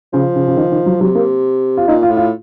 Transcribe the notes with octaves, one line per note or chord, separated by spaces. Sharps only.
C#3 F3
C#3
C#3
D#3
D#3
F#3
C3 F#3
A#3
F4
A#2 D#4
F4
A2
F4